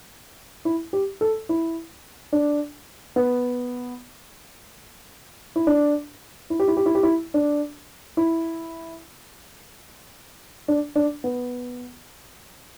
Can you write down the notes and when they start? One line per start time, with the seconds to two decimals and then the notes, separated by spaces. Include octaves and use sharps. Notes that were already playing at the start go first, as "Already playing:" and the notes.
0.65 E4
0.93 G4
1.21 A4
1.49 E4
2.33 D4
3.16 B3
5.56 E4
5.67 D4
6.50 E4
6.60 G4
6.68 E4
6.77 G4
6.86 E4
6.95 G4
7.03 E4
7.34 D4
8.17 E4
10.68 D4
10.96 D4
11.24 B3